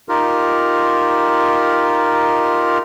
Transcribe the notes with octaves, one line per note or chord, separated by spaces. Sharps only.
D#4 F4 G4 A#4